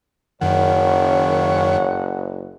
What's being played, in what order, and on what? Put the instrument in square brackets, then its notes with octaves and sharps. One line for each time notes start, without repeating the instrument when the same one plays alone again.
[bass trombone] F#1 [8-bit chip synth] F#2 D#3 [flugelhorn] C#5 [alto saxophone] F#5